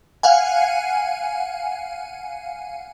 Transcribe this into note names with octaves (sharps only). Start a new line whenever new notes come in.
F5 F#5 G#5